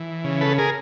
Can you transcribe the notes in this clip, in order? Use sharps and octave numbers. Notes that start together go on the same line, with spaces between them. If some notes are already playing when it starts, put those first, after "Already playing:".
Already playing: E3
C#3
A4 B4
G#4 A#4